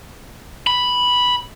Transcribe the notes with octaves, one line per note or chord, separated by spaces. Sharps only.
B5